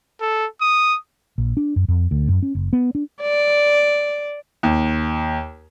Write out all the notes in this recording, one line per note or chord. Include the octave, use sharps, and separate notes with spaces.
A4
D#6
A#1
D4
F#2
F2
D2
F#2
C#4
F#1
B3
D4
D5
D#2